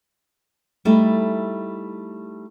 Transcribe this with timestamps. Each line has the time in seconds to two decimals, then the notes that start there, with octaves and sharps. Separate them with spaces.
0.85 G3 A3 D#4 E4 A4